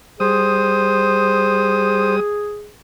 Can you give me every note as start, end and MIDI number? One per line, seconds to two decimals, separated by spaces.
0.20 2.20 55
0.20 2.71 68
0.20 2.15 72
0.20 2.20 87